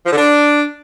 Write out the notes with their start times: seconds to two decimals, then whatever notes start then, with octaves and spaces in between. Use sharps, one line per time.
0.06 F3
0.12 D3
0.17 D4